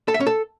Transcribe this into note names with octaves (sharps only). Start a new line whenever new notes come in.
A4
E5
C#4
A4